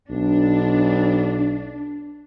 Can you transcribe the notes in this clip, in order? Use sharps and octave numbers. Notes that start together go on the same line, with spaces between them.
B1 D4